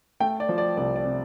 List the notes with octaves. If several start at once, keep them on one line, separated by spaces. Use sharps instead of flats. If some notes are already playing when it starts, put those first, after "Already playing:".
A3 G5
D5
F3
D5
C2 D5
D5
C3